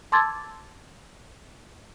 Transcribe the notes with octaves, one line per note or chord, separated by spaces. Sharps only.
A5 C6 D6 E6 G#6 A6